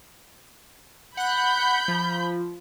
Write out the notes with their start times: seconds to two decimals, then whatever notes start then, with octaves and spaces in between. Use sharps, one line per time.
1.17 F#5 B5 F#6 G6
1.88 F3